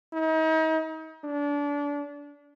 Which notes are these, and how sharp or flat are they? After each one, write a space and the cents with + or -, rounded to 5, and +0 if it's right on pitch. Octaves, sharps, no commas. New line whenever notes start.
D#4 +40
D4 -30